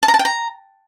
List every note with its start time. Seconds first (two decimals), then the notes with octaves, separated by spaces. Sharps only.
0.03 A5
0.08 A#5
0.14 A5
0.19 G5
0.25 A#5